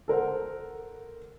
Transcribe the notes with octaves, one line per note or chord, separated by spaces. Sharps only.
A4 A#4 C5 F#5